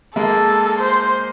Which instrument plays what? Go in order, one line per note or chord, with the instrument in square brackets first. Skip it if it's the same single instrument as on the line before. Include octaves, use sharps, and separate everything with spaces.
[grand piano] G#3 A#3 [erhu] A4
[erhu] C5